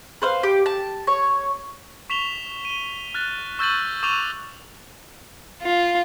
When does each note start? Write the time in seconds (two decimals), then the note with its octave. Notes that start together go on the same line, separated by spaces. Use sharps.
0.22 B4 C5 F5
0.43 G4
0.66 A5
1.07 C#5
2.10 C#6 B6 E7 F7 G7
2.65 D#7 G7
3.14 F6 F#6 A6
3.59 C#6 E6 G6 A6 D#7 F#7
4.03 C#6 D6 E6 G6 D#7 F7
5.62 F4